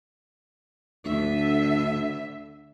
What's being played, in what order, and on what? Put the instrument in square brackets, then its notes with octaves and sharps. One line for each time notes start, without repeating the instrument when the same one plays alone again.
[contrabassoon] D2 [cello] D3 E5